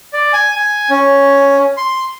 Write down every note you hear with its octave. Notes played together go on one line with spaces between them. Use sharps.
D5
G#5
G#5
C#4
C6